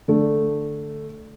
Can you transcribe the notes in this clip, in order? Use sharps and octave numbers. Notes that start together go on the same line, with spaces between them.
D3 A3